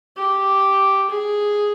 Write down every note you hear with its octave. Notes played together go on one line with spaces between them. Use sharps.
G4
G#4